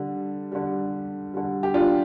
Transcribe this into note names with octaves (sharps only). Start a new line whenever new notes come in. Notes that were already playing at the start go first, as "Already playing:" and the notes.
Already playing: D3 G3
D3 G3
D3 G3
G4
D4 F4